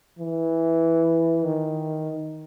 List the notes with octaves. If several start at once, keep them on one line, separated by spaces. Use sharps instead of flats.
E3
D#3